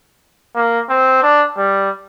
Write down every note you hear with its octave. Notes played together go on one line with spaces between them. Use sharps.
A#3
C4
D4
G3